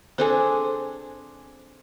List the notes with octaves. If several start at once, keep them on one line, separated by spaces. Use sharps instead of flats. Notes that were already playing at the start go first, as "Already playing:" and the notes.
C4 D4 G#4 A4 C5 G#5